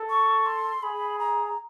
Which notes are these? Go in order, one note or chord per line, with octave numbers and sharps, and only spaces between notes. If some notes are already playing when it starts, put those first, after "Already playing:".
Already playing: A4
C#6
C6
G#4 B5
A#5